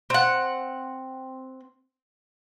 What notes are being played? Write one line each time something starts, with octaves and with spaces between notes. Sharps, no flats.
C4 F#5